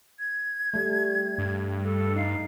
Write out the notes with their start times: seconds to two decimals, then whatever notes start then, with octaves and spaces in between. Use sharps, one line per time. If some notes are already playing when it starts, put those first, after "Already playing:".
0.19 G#6
0.74 G3 A3
1.38 G2
1.84 A4
2.16 D#4 F5